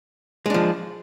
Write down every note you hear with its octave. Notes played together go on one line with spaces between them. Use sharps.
F3 G#3 D4